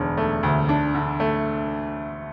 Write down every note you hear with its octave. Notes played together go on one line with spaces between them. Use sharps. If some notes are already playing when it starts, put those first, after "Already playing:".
Already playing: E1 D2 D3
A3
D2
D4
D3
A3